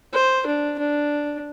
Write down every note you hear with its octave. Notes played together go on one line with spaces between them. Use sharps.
C5
D4
D4